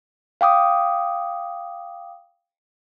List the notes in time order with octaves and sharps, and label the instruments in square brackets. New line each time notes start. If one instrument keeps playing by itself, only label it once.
[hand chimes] F5 G5 D6 D#6